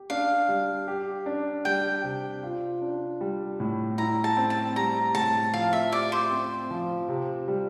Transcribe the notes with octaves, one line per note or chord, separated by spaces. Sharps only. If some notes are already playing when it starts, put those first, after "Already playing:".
Already playing: G4
D4 F5
G3
G4
D4
G3 G5
C3
F4
D4
G3
A2
E4 A#5
A5
C4
A5
G3 A#5
A2 A5
F3 F5
E5
G4 D5
C5
C4
F3
C3
G3